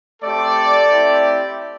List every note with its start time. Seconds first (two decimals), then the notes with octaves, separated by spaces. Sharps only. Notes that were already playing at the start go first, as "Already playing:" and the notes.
0.22 A3 C4 G4 A4 D5
0.88 A3 C4 E4 G4